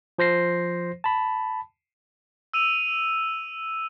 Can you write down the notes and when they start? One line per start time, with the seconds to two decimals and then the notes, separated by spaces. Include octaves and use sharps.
0.18 F3 C5 A#6 C7
1.04 A5 B5
2.54 E6 D#7 F7